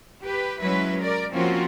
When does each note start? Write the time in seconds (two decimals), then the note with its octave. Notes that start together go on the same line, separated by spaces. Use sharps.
0.23 G4 B4
0.61 F#3 G#3 C#4 E4 B4
1.01 A#4 D5
1.33 F3 A#3 C4 C#4 F4 F#4